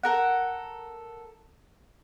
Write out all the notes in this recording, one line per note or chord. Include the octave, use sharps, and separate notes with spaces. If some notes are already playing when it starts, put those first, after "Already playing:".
A4 A#4 F#5